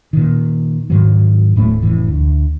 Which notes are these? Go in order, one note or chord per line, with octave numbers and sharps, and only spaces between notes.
A#2 D#3
G#2 D#3 F#3
D#1 A2 G3 A3
F1 A2 E3
D2